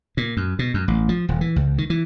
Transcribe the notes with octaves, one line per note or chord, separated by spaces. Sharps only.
A#2
F#2
B2
F#2
A1
F3
D#1
E3
C#2
D#3
E3